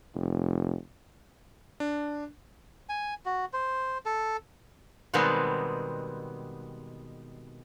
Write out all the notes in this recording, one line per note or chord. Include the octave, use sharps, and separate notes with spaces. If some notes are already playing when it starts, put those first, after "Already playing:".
F1
D4
G#5
F#4
C5
A4
B2 D#3 G3 G#3 B3 C4